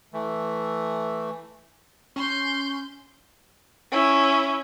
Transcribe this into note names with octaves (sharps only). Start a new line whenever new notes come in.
E3 A3
C#4 C6 G6
C#4 E4